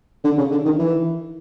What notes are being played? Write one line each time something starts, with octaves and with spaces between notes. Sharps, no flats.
D3
C#3
D3
D#3
E3